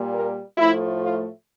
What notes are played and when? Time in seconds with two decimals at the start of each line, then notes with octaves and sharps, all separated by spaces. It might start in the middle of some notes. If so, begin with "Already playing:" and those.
Already playing: A#2 G3 A#3
0.13 A#4
0.57 A2 F3 A3 E4
1.00 F4